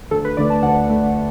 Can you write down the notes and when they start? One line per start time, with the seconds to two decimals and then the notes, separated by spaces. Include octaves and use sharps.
0.11 D2 A4
0.25 B4
0.37 D3 A3 D5
0.50 A5
0.63 D2 F#5
0.90 D3 A3